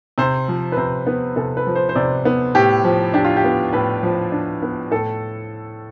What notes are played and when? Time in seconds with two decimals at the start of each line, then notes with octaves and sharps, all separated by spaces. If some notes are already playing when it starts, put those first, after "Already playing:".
0.18 C3 C5
0.48 F3
0.72 B4
0.77 C3 C5
1.07 B3
1.36 C3 A4
1.57 B4
1.67 F3
1.75 C5
1.89 C5
1.96 C3 D5
2.25 B3
2.55 A2 G4
2.84 F3
3.14 D4 G4
3.24 F4
3.37 G4
3.44 B3
3.73 A2 B4
4.03 F3
4.32 D4
4.62 B3
4.91 A2 A4